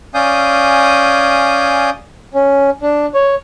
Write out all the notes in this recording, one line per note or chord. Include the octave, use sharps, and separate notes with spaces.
C#4 D5 F5 G#5 D#6 G6
C#4
D4
C#5